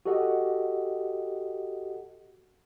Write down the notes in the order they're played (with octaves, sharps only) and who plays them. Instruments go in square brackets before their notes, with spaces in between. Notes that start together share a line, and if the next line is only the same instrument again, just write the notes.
[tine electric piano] F#4 G4 A4 D#5 F#5